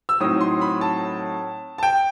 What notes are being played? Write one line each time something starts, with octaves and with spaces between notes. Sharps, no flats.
E6
A2 F#3 C4 D#4 D#6
C6
B5
A5
A5
G5